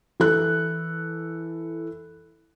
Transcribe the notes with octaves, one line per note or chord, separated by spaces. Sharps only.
E3 A4 F#6